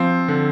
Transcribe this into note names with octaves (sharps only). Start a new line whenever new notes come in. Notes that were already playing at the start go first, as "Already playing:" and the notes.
Already playing: F3 C4
D3